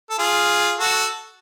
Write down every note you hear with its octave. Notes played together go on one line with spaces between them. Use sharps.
A4
F4 G#4
F#4 A4